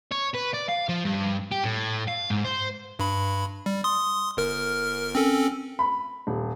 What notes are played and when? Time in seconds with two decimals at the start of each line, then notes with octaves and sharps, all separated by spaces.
0.11 C#5
0.34 B4
0.53 D5
0.68 F5
0.89 F3
1.05 G2
1.52 G4
1.64 A2
2.08 F5
2.30 G#2
2.44 C5
2.99 G2 B5
3.66 G3
3.84 C6 D#6
4.37 G1 A#4 F6
5.15 C4 C#4 A4
5.79 B5
6.27 D#1